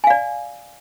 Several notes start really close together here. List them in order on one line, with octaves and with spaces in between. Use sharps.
G#5 F5 D5